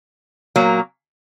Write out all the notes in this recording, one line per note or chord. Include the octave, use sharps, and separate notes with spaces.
A#2 F#3 A#3